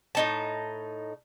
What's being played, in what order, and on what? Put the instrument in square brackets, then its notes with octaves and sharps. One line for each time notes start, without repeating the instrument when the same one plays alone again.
[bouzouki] A2 D#4 A5